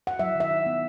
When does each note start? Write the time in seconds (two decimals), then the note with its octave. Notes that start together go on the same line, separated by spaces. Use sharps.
0.07 F#5
0.19 F#3 E5
0.35 D#3
0.40 E5
0.51 D#4
0.66 B3